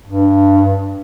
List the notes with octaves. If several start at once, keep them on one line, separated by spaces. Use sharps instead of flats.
G2